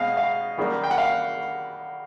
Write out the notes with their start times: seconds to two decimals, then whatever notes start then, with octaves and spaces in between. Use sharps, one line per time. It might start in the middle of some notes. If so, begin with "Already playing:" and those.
Already playing: B2 G#3 C4 D#5 F5
0.17 F5
0.57 F#2 D#3 G3 A#3
0.84 G5
0.91 F#5
0.98 F5